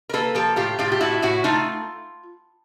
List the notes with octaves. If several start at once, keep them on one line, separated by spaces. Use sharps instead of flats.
A#4
A#3 A4 B4
F3 G4 A4
A2 F4 G4
A2 F4 G4
G4
A2 E4 F#4
A2 E4 F#4
A3 D#4 F4